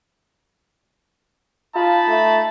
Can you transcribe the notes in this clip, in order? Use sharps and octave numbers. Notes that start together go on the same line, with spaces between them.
D#4 F4 A5 B5
A3